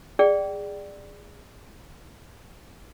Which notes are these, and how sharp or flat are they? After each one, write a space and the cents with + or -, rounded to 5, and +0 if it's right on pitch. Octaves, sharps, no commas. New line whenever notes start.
G#4 -20 D5 +5 G5 -25